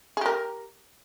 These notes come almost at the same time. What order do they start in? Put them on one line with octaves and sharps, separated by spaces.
G#4 G4 A#4